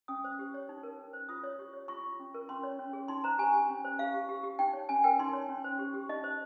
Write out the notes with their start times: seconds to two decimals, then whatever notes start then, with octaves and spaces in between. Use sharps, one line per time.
0.08 C#4 D#6
0.24 C5
0.39 G4
0.54 C#5
0.69 D#4
0.83 A#4
0.99 C#4
1.13 C5
1.29 F4 D#6
1.43 C#5
1.59 G4
1.74 C#5
1.88 F4 C#6
2.04 F4
2.19 C#4
2.34 A#4
2.49 C#4 C6
2.63 C#5
2.79 C#4
2.93 G#4
3.08 D#4 C6
3.24 C5 A#5
3.38 G4 G#5
3.53 G4
3.69 C#4
3.85 C5
3.99 G4 F5
4.14 G4
4.29 G4
4.43 G4
4.59 D#4 G5
4.73 C#5
4.89 C#4 G#5
5.04 A#4 G5
5.19 D#4 C6
5.33 C#5
5.49 C#4
5.64 C5
5.79 G4
5.94 G4
6.09 D#4 D#5
6.24 C5